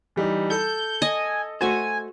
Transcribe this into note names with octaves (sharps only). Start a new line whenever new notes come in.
E3 G3 D#4
A4 G6
D#5 G#5
A3 F#4 C5 G#5